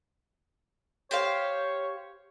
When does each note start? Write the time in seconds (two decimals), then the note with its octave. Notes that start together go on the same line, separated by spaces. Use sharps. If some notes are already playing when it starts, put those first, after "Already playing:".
1.11 G4 C5 C#5 F5